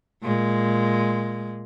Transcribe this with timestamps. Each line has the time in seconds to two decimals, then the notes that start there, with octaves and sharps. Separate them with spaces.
0.23 A#2 G#3